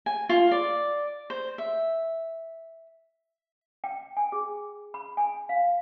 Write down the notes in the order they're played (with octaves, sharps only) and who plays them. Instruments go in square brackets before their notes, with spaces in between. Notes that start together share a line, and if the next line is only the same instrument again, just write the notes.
[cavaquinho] G#5
F4
D5
C5
E5
[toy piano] G5
G#5
G#4
B5
G#5
F5